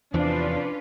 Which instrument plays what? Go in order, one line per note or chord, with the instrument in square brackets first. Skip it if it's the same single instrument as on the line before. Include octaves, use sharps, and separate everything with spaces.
[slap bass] E2 E3 [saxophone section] C3 F3 [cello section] C#4 F4 B4 [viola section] D4